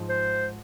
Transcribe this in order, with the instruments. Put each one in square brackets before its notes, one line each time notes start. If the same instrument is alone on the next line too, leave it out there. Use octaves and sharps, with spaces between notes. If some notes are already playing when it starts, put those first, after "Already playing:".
Already playing: [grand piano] G#2 F3 G#3
[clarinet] C5